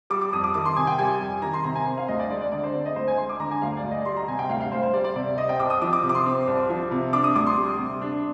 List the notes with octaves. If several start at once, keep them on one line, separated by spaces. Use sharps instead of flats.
G3 D6
D6
F2 D#6
D6
D#3 D6
C6
C3 G#5
G5
G3 G#5
F2
D#3 A#5
C6
C3 A#5
G#5
C4
F5
D2 D#5
D5
G#3 D5
D5
D3 D5
C5
C4
D#5
D2 C5
G#5
G#3 C6
D6
D3 A#5
G#5
D2 F5
D5
D2
D#5
G3 C6
A#5
C3 G#5
G5
D2 F5
F5
D2 C5
C5
G3 D5
D5
C3 D5
C4 D#5
G5
C2 D6
D#6
F3 D6
D6
C3
D6
C6
C4
C2
F3
C3
D4 D6
D#6
D2 D6
C6
G3
C3
D4